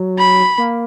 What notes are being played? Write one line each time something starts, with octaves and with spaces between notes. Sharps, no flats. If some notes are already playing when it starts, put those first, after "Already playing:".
Already playing: F#3
B5
A#3